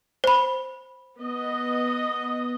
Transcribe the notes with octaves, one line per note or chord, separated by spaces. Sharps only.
C5 B5
B3 D#5